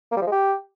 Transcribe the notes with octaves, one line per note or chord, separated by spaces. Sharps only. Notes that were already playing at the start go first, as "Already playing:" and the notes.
A#3
G3
F3
G#3
G4